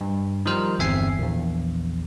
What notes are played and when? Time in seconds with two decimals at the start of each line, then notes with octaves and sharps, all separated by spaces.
0.01 G2
0.46 D#3 F3 G3 A#4 C5 F6
0.78 G1 E2 C4 E5 G#5 C7
1.19 A#1 E2